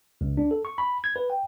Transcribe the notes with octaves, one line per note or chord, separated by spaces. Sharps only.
C#2
D4
A4
C#6
B5
G#6
B4
G5